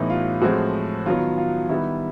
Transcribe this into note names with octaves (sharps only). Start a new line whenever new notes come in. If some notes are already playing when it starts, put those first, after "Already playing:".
Already playing: A2 E3 G3 B3 D#4 E4
F4
A2 F3 G#3 C4 F#4
D#3 F#3 B3 F4
F4
D#3 G3 B3 E4